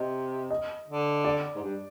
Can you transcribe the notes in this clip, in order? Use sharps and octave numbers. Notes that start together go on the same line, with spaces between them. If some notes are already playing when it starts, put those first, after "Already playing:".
Already playing: C3 D#5
D#5
D3
D5
G#2
G2